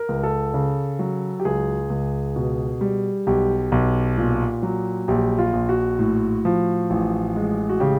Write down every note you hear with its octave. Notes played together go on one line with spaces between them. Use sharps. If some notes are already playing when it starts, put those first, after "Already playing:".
Already playing: A#4
C#2
A4
C#3
F#3
G4
C#2 G#4
C#2
B2
G3
B1 G4
B1
A#2
F#3
A#1 G4
F4
A#1
F#4
A2
F3
A1
G#3
F#4
C#3 G4